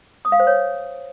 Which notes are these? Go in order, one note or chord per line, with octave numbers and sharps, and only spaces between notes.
D#6
F5
C5
C#5